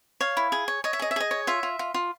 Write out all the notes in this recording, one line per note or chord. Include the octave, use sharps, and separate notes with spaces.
C#5 F5
E4
G#4
C#5
C#5 D#5
E5
G#4 D#5
E5
G#4 D#5
C#5
F4 E5
F4
F4
F4